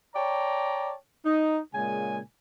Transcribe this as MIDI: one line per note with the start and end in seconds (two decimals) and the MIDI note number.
0.15 0.93 73
0.15 0.93 74
0.15 0.93 79
0.15 0.93 81
0.15 0.93 82
1.25 1.59 63
1.74 2.19 46
1.74 2.19 49
1.74 2.19 56
1.74 2.19 80